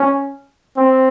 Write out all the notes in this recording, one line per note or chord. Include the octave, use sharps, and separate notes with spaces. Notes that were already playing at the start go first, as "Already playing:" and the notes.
Already playing: C#4
C4